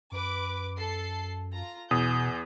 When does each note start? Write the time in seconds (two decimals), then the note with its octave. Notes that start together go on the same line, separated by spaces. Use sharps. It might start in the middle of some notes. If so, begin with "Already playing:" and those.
0.12 F#2 B4 D6
0.77 A4 C7
1.54 F4 A#5
1.91 E2 B2 G#4 D#6 G6